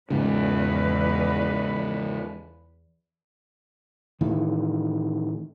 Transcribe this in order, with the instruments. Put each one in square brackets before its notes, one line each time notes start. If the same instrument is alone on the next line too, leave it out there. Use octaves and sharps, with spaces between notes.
[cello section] E2 B4 [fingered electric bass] G#2 C#3
[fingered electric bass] A2 D#3 E3